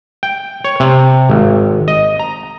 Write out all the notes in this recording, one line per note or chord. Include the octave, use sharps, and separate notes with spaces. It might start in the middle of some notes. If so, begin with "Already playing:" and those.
G5
C#5
C3
G#1
D#5
A#5